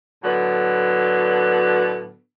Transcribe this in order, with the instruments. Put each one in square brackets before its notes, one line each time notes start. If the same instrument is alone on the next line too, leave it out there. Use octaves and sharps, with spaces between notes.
[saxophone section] A2 D3 F#3 B3